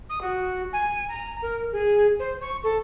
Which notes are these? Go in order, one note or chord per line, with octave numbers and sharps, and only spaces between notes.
D#6
F#4
G#5
A#5
A#4
G#4
C5
C#6
A4